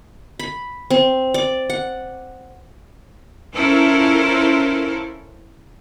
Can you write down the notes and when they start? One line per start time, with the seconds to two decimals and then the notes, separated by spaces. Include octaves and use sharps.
0.39 B5
0.90 C4
1.34 D5
1.70 F#5
3.54 C#4 E4 F4 A4 A#4 C5